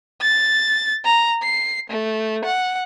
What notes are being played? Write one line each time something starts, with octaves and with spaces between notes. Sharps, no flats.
A6
A#5
C7
A3
F#5